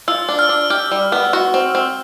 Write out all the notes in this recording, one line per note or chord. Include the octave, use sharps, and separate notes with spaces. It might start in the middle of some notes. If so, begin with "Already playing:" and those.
F4 E6
D4
F6
D4
G4 F6
G3
B3
F#4
C4
C4